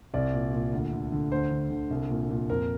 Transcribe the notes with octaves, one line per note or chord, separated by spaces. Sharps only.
C2 D5
A#2
A#2
D2
D3
D3
D2 C5
D3
D3
C2
A#2
A#2
F2 A#4